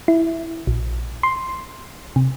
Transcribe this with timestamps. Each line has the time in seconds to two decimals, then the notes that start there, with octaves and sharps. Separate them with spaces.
0.08 E4
0.67 A#1
1.23 C6
2.16 C3